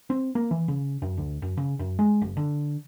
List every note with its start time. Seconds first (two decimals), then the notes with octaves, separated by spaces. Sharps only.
0.10 C4
0.35 A#3
0.51 E3
0.68 C#3
1.02 F#2
1.17 D2
1.42 F#2
1.57 C#3
1.79 F#2
1.99 G#3
2.22 F#1
2.37 D3